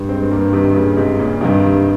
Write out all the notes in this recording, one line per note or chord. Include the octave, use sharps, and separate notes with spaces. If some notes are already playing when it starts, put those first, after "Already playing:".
Already playing: G2
G#3 C4
G3 A#3
C3 D#3
A#2 C#3
G#2 C3
A#2 C#3
G2 C3 D#3